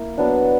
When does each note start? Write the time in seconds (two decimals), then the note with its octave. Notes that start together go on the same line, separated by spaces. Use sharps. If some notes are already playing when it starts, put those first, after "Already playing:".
Already playing: A#3 E4
0.18 F#3 B3 D4